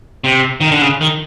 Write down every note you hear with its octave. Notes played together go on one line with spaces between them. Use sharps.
C3
D#3
D3
C#3
D#3